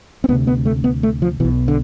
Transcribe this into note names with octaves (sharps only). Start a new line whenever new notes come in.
C4
D2 C3 B3
B3
A3
B3
A3
F3
B1 B2 E3
D3